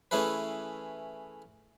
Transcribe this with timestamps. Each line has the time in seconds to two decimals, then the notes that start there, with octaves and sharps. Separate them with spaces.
0.11 E3 A3 C#4 E4 G#4 B4